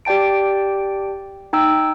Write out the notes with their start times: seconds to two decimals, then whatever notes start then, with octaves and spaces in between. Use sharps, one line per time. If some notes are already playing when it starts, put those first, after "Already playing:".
0.05 G4 D5 G5 A5 D7
1.53 D#4 G5 E6